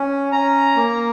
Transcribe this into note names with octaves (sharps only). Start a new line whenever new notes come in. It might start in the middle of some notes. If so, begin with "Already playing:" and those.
Already playing: C#4
C#4 A#5
A#3